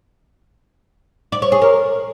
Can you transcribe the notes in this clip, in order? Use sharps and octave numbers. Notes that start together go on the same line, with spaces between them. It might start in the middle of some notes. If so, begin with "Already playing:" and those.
D5
C#5
G#4
A#4